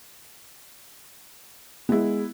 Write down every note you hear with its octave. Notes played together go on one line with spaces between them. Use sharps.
G#3 B3 E4